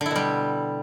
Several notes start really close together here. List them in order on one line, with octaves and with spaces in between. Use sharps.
D3 E4 B2 G3